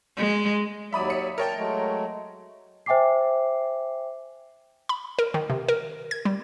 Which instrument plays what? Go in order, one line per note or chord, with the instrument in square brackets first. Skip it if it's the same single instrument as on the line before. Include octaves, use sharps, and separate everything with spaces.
[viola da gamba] G#3
[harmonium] D#2 F#3 D5 [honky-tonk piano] E5 B5 D#6
[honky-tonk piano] E5 D#6 C#7
[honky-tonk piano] A#4 C#5 G5 [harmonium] A5
[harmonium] F#3 G#3 A3
[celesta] C5 E5 G5 G#5 D6 C7
[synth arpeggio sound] B5
A#4
D#3
C3
A#4
G#6
G3